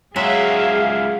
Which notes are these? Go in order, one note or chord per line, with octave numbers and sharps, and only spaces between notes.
C#2 F#3 G#3 G#4 E5 F5